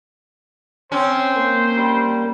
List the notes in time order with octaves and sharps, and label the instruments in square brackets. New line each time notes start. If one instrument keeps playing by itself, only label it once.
[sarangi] C4 [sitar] C#4 [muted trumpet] C5
[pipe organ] A#3
[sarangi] G3